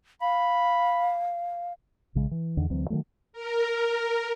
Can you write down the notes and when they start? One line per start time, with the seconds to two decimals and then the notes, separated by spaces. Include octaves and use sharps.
0.21 F5 B5
2.15 A#1 C#3 G#3
2.31 E3
2.57 E2 D3 D#3
2.70 D2 E3 F#3 C4
2.90 D#3 F3 F#3 A3
3.33 A#4